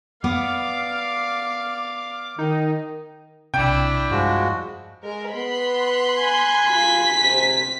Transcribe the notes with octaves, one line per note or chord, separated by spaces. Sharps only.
B3 D5 F5 D6
D#3 D#4
B1 C3 D4 E4 G5
G2 F3 G#3 F#4
G#3 A#4
B3 B5 C6 F#6
G#5
F4 B6
C3